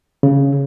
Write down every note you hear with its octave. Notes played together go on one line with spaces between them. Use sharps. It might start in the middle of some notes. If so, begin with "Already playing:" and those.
C#3